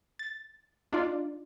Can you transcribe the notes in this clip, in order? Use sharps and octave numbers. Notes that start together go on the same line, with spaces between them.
A6
D4 D#4 F4 D5